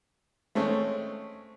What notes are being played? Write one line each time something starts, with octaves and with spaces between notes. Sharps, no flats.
G#3 A3 C4 C#4